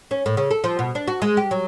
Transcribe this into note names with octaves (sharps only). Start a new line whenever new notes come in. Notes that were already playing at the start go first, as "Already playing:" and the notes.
C#4
A2
C#3
A4
F3
B2
D4
F#4
G#3
G4
F#3